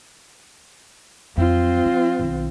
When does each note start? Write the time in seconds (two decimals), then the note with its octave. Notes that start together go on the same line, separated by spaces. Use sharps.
1.37 F2 F#3 C4 F4
1.85 F3
2.19 B1 D#3